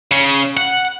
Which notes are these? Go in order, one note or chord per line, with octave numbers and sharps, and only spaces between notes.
C#3
F#5